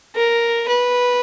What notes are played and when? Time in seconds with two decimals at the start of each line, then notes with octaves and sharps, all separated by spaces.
0.16 A#4
0.69 B4